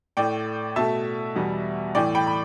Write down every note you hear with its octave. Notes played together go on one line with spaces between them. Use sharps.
A2 A3 D5 G5
B2 A3 E5 A5
E2 B2 G3 B3
A2 E3 A3 D5 G5
G5 B5
B5